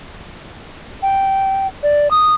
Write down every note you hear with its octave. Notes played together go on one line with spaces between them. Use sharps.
G5
D5
D#6